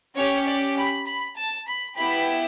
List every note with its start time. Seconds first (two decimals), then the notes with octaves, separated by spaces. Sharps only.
0.16 C#4 G4 C#5
0.47 D5
0.77 B5
1.07 B5
1.37 A5
1.68 B5
1.97 B3 E4 G4 B5